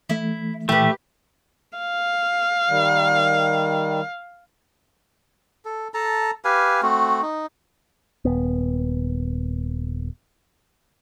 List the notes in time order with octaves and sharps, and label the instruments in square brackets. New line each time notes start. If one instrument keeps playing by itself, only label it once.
[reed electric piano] E3 A3 [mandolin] E4
[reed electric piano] A#2 E3 [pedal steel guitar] A3 [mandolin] G4 B4
[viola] F5
[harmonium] D#3 G3
[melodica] A4
A4 A5 A#5
G4 B4 F5 G#5
A3 C4 F#4
D#4
[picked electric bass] D#1 B3